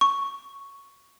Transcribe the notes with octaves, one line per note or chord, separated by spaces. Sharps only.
C#6